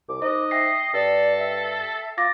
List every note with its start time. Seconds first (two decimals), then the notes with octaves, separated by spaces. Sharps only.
0.09 C2 D6
0.22 D#4 C5 D#5
0.51 E5 G5 A#6 C7
0.94 G2 A4 D5
1.38 E5
2.18 F4 D6 A6 A#6